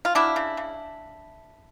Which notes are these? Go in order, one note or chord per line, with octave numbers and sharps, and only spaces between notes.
F4
F#3 D4 E4
C#3
C#3